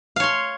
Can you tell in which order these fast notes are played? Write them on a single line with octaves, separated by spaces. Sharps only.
F5 C#5 C6